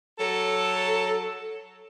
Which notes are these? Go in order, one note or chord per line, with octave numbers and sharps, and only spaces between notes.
F#3 A4